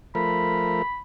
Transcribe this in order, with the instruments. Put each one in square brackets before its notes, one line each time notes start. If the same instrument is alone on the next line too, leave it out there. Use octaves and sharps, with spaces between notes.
[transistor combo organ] F3 A3 A#4 [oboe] B5